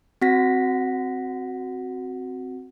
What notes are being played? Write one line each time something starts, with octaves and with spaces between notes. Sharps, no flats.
C4 F#4 F#5 A#6 B6